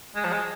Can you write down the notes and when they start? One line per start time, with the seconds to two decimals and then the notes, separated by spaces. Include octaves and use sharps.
0.15 G#3
0.24 F3
0.32 G#3